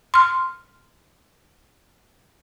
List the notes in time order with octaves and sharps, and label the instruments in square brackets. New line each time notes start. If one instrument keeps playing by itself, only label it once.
[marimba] C6 F6